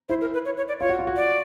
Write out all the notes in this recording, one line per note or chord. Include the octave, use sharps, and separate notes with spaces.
E4 C5
A#4
B4
C#5
C#5
D5
F4 C#5
F#4
F4
F#4
D5